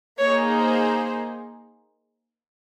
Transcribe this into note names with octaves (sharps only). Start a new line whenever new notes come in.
A#3 D#4 G#4 C#5
C5